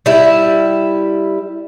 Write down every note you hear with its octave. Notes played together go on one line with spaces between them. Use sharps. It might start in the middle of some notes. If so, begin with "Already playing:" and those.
G3 E4